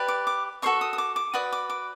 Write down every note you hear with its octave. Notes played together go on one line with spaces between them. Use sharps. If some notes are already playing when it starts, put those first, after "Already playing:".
Already playing: G4 B4 D5
D6
D6
F#4 A4 C5 D#5 C#6
D#6
D#6
D6
D6
F#4 B4 D5 D#6
D6
D6